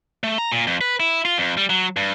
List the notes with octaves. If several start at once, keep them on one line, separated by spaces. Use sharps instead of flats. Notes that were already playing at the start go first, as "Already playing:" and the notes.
A3
A#5
A#2
F2
B4
E4
F4
F2
G3
F#3
G2